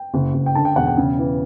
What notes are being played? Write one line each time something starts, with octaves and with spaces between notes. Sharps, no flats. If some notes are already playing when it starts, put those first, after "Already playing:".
Already playing: G5
F#1
F#1
G5
D3 A5
G5
E1 F#5
G5
C#3
E3